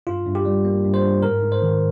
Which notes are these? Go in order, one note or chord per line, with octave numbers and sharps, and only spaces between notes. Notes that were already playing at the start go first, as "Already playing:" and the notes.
G2 F4
G2
G4
G3
A#3
G2
C5
G2
G#2 A#4
G#2
C5
D#3